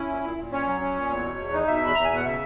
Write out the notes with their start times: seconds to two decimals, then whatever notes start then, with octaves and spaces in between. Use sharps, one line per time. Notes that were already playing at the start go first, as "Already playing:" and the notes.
Already playing: C#4 E4
0.09 A#2
0.23 A#2
0.37 A#2
0.52 C#4 C#5
0.66 F#3
0.81 C#4
0.96 A#2
1.09 E2
1.23 B2
1.38 E2
1.53 D#4
1.68 B2 E5
1.82 E2 B5
1.95 E2 A#5
2.04 G#5
2.11 B2 F#5
2.25 C#3 E5